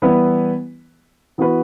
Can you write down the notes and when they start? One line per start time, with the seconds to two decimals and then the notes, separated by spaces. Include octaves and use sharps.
0.02 E3 G3 B3 E4 B4
1.38 E3 B3 F#4 B4